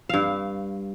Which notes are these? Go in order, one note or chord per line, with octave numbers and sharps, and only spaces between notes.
G2 F5